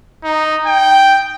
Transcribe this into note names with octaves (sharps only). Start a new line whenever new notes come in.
D#4
G5